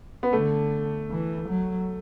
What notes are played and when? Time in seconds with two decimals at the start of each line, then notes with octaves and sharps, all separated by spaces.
0.23 B3
0.33 D3 A3
1.11 E3
1.49 F#3